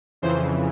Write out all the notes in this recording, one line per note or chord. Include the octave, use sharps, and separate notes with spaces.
F2 C#3 E3 C5